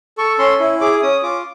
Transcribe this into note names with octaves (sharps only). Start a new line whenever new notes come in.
A4 C#6
C#4 C6
E4
G#4 D6
C#4 D#6
F4 D6